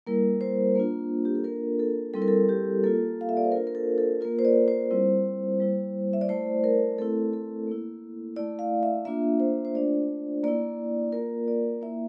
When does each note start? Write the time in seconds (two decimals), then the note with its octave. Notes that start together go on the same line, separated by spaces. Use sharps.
0.07 G3 A#3 E4 A#4
0.41 C5
0.75 A#3 D4 F4
1.25 G4
1.35 A4
1.44 A#3 D4 F4 A#4
1.80 A4
2.14 G3 C4 E4 A4
2.22 A#4
2.28 A4
2.49 G4
2.84 A#3 F4 A4
3.21 F5
3.29 E5
3.37 D5
3.45 C5
3.52 A#3 D4 F4 A#4
3.67 A#4
3.75 A4
3.98 A4
4.21 A#3 F4 A#4
4.39 C5
4.45 D5
4.68 C5
4.91 G3 C4 E4
5.60 G3 A#3 E4
6.13 E5
6.21 D5
6.29 A3 E4 C5
6.64 A#4
6.98 A3 C4 E4 A4
7.33 A4
7.67 A#3 E4
8.36 A3 E4 D5
8.59 F5
8.83 E5
9.05 A#3 D4 F4 E5
9.40 C5
9.65 C5
9.74 A3 D4 F4 D5
10.43 A#3 E4 D5
11.12 A#3 F4 A#4
11.48 D5
11.82 A#3 E4 E5